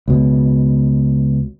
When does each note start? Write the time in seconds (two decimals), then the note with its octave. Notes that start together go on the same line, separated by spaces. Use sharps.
0.08 C#2 B2